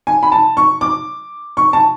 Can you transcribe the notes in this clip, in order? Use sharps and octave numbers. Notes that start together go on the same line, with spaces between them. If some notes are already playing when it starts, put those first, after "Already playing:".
G#5
B5
A5
C#6
D6
C#6
A5